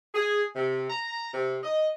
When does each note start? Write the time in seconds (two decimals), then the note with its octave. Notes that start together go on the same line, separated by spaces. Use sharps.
0.15 G#4
0.56 C3
0.90 A#5
1.34 C3
1.63 D#5